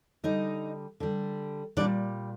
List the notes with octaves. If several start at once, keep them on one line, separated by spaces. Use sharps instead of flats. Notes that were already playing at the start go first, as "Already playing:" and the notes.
D3 G3 D#4 D#5
D3 G3
A#2 G3 D4 D5